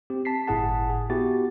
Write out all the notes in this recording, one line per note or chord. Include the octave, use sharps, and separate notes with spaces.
C4 G4
A5 B6 C7
G1 A2 E4 G#4 F#5 A5
G#4
B3 E4 F#4 G4 A6